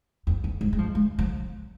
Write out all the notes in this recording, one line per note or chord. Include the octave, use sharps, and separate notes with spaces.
F2
F2
G#2
G#3
F3
G#3
F3